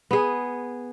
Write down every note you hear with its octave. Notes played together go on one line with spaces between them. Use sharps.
B3 G#4